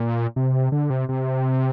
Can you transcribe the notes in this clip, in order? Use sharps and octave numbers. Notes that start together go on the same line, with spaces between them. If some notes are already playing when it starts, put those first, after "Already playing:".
Already playing: A#2
C3
D3
C3
C3